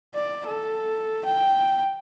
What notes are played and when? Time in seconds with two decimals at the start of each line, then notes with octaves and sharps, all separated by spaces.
0.15 D5
0.46 A4
1.26 G5